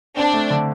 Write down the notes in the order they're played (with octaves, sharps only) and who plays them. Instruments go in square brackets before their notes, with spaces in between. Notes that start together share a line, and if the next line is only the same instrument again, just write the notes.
[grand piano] C4 [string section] D4
[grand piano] A3
D3